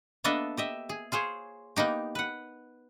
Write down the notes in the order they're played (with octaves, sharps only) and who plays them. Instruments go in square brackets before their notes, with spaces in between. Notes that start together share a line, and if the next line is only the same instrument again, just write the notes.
[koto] A#3 B3 D4 A4 D#5 E5
G4 D#5 E5
G#4
F4 G#4 C5 C#5
A#3 B3 D#4 G4
B4 F#5